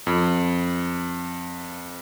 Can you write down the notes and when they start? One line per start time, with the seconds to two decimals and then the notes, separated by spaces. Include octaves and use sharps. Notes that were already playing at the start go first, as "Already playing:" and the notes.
0.07 F2